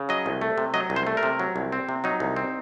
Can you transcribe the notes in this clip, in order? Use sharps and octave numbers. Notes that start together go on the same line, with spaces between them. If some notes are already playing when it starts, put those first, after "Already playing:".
Already playing: C#3
F#3 D#5
C2
A3
C3
F#3 D#5
C2
C5
A3
A#4
C3
F#3
C2
C4
C3
F#3 D#4
C2
C4